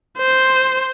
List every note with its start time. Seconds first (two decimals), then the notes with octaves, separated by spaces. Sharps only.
0.18 C5